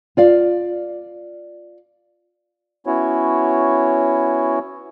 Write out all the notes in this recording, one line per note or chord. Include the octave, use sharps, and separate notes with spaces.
F4 D5 F5
B3 C#4 E4 F#4 C#5